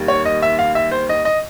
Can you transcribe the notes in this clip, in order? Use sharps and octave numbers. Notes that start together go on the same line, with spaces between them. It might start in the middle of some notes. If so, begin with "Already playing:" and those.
Already playing: D#2 D#3 G3 A#3
C#5
D#5
E5
F5
E5
C5
D#5
D#5